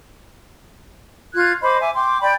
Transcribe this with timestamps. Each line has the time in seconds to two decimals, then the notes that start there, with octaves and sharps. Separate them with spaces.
1.34 F4 F#6 G#6
1.62 C5 D#5 B5 D6
1.81 E5 G#5 D6
1.94 G5 C6 D6
2.21 D5 G5 B5